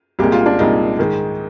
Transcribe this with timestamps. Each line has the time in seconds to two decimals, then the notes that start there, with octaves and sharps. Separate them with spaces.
0.19 C2 A#2 G#3 G4
0.32 F4
0.46 D4
0.59 C2 A#2 G#3 D#4
0.99 G#2 D#3 G#3